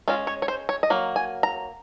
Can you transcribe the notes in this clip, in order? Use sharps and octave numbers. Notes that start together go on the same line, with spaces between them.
G#3 C#4 F4
C#5
C#5
C5
C#5
D#5
F#3 A#3
G#5
A#5